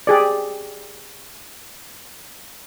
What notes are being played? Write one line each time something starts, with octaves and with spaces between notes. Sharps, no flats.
G4 G#4 D5